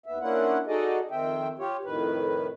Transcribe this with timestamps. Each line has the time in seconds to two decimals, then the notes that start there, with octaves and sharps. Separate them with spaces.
0.06 D#2 B3 E5
0.21 A#3 C#4 D4 E4 F4 F#5
0.67 D#4 F#4 G#4 A4 D5 D#5
1.11 F2 D#3 C4 E5 G5
1.59 F4 G4 C#5
1.85 F2 A2 D#3 B4